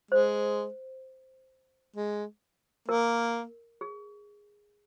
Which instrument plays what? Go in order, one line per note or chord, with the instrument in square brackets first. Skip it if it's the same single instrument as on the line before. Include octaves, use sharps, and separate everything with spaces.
[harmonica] G#3 [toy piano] C5
[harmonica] G#3
[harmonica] A#3 [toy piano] A#4
[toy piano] G#4